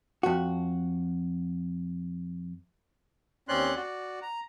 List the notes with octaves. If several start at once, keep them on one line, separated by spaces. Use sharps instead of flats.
F2 F#4
D#2 C4 C#4 D5 C6 F#6
F#4 D5
A#5